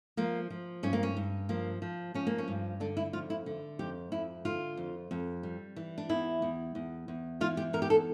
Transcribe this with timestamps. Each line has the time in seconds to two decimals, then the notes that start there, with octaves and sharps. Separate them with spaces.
0.17 F3 A#3
0.50 F3
0.83 G2 C#4
0.93 A#3
1.03 C#4
1.17 G2
1.49 F3 A#3
1.82 F3
2.14 F3 C#4
2.27 A#3
2.38 C#4
2.48 G2
2.80 D3 D4
2.97 E4
3.13 F2 F4
3.30 E4
3.46 D3
3.79 F2 G4
4.12 F2 E4
4.45 D3 F4
4.77 F2
5.11 F2
5.43 G3
5.76 E3
5.98 D4
6.09 E2 E4
6.42 E2
6.75 E2
7.08 E2
7.41 E3 F4
7.57 G4
7.73 E2 A#4
7.82 G4
7.90 A4